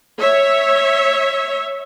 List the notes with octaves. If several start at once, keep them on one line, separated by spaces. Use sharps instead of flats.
C#5 E5